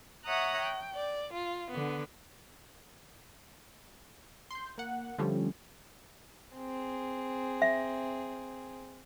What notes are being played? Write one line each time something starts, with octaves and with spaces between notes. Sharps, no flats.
C#5 E5 F#5 A#5 D#6 F#6
G5
D5
F4
D3 B3
C6 G6
A#3 F#5
D3 F3 G3 A3 C#4
C4 G#4
E5